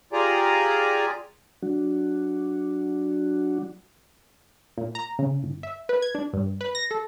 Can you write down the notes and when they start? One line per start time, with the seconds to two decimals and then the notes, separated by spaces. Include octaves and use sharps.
0.13 F4 G4 G#4 D5 G#5 A#5
1.62 F#3 D4 F#4
4.78 A#2
4.95 A#5
5.19 C#3
5.43 G1
5.63 E5
5.89 B4
6.02 G#6
6.15 D4
6.33 G2
6.61 B4
6.75 A#6
6.91 A4